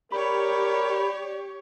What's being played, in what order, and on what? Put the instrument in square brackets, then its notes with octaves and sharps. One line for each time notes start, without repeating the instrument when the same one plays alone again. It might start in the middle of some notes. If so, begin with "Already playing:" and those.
[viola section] G4 C#5 [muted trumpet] A#4 [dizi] D5 [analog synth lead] B5